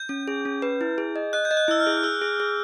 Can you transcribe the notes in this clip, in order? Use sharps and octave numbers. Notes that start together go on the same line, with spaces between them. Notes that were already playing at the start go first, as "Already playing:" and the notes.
Already playing: G6
C#4
G#4
C#4
B4
E4
G#4
D#5
D#5 F#6
G6
D#5
F#6
E4 E6
F6
G#4
F6
G#4 E6
G#4
G#4